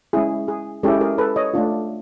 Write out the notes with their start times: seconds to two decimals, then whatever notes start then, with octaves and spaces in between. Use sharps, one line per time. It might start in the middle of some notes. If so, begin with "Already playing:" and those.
0.13 G#3 C#4 E4 G#4
0.48 G#4
0.83 G#3 C#4 E4 G4 A4
1.01 G#4 A#4
1.18 A4 B4
1.36 C#5 D#5
1.54 A3 D4 F4